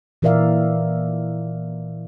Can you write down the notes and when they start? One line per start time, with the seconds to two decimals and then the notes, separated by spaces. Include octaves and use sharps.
0.22 A#2 E3 A#4 D5 E5 F5